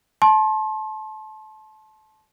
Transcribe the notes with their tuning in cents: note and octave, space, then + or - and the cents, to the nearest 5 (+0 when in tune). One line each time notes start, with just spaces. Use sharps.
A5 -25 C6 +35